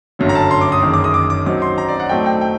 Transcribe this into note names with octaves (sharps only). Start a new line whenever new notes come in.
G1 F#2 D3 F#3
A#5
A5
C6
D6
D#6
F#1 F#2 D#3
D6
D#6
D6
D6
F#2 F#3 C4 D#4 D6
C6
A#5
D5
F#5
A2 F#3 A3 C4 D#4 G5
G5
G5